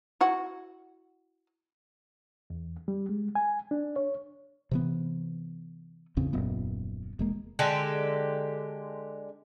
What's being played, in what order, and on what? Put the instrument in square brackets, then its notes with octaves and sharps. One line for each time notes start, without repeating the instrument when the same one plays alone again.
[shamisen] E4 F#4
[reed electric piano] E2
G3
G#3
G#5
D4
C#5
[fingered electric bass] C3 E3 B3
A1 E2 C#3 C4
D#1 F#2 A#2 B3
E1 G#3 A#3
[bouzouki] D3 G#3 G4 A4